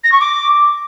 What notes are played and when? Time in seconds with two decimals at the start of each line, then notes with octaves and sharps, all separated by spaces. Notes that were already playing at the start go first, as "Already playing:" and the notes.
0.04 A#6
0.12 C#6
0.20 D6